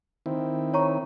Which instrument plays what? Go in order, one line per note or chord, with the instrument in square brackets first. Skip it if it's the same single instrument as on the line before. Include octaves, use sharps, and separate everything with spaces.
[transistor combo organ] D#3 C4 E4
[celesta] C#5 A#5 C#6